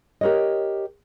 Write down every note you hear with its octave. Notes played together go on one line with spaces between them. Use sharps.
G4 A#4 B4 C#5 D#5